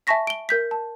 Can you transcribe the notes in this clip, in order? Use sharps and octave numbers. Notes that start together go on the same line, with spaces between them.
E5 G#5 A5 C#6 A#6 B6
D7 G7
A#4 G6 B6
A5